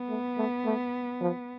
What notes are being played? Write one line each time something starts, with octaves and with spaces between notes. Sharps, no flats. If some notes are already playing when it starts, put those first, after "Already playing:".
Already playing: B3
A3
A3
A3
F3